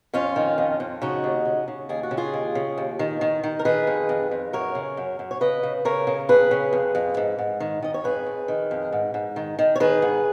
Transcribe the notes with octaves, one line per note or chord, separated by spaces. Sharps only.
F2 C#4 F4
D#3
F2
F2
C#3 D#4 F#4
D#2
C#3
C#3
D#2 G#4
F#4
C#3
F4 G#4
D#2
C#3
D#2
D#3
D#3
D#3
A#4
D#3 G#4 B4
F2
F2
F2
F#2 A#4 C#5
C#3
F#2
F#2
C#5
C#3 B4 D#5
C#3
C#3 A#4 C#5
C#3
F2 G#4 B4
C#3
F2
F2
G#2
G#2
D#3
D#3 D#5
C#5
F2 G#4 B4
F2
D#3
F2
G#2
G#2
D#3
D#3
C#5
D#3 G#4 B4
G#2